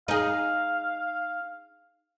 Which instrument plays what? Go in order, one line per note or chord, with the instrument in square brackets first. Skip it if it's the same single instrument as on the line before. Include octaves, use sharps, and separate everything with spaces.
[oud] D#4 G#4 [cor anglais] F5